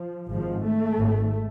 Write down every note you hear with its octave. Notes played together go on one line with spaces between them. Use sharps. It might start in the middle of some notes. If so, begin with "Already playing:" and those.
Already playing: F3
G#1 G#2 F3
A3
G#1 G#2